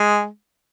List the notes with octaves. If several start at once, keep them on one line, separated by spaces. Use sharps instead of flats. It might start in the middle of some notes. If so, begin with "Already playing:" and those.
Already playing: G#3